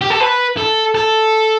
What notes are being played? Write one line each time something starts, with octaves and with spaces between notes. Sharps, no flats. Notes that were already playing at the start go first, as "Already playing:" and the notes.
G4
A4
B4
A4
A4